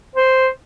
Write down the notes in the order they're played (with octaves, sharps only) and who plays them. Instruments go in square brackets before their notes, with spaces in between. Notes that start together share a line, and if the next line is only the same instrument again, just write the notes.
[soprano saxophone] C5